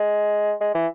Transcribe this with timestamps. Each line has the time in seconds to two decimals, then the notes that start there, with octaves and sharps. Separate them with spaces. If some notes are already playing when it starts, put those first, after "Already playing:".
Already playing: G#3
0.61 G#3
0.74 E3